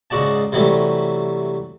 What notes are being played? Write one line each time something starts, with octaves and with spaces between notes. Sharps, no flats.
C#2 G#2 F#4 D5 A5
C3 E3 F#3 G3 A3